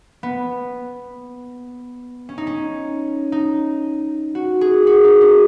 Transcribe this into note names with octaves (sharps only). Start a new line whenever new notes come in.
B3
C#4
D#4
C#4
D#4
F#4
G#4
F#4
D#4
C#4